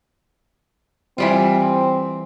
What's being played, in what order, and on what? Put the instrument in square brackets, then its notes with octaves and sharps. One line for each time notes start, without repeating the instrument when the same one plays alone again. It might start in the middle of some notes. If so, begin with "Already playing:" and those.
[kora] E3 G3 F4 [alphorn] C4